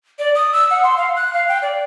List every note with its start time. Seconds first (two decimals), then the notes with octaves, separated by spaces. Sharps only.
0.19 D5
0.35 D#6
0.53 E6
0.71 F#5
0.84 C6
0.97 F5
1.16 F#6
1.33 F5
1.48 G5
1.62 D5